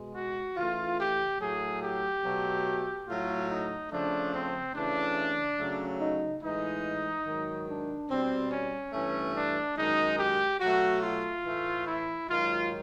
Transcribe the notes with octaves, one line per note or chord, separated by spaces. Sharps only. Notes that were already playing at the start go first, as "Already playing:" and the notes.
Already playing: B2 G#3
F#4
C#3 E3 A3 F4
G4
A2 F#3 A3 G#4
G4
B2 F#3 A3
A2 F#3 A3 F4
D#4
C#3 F3 A3 D4
C4
C#3 E3 A3 D4
C#3 F#3 A3
D#4
A2 E3 G#3 D#4
G#2 D#3 F#3
D4
B2 G3 C4
C#4
G2 E3 A3 C#4
D4
F#2 D#3 G#3 D#4
G4
B2 F#3 A3 F#4
F4
A2 E3 A3
E4
G#2 D#3 F#3 F4